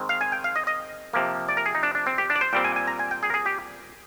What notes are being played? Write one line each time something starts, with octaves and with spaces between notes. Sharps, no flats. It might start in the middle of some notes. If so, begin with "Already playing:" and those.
Already playing: D#3 G#3 C4
F5
G#5
G5
F5
D#5
D#5
C3 F3 A#3
D5
A#4
G#4
D#4
D4
D4
C4
G4
D4
D5
C5
A#2 G3 C4 G5
G#5
G#5
A#5
G#5
G5
G#4
A#4
G#4
G4